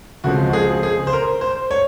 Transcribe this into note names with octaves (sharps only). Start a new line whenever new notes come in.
C#2 C#3 F3 G#3 C4 F#4
F#4
G#4
G#4
C5
A#4
C5
C#5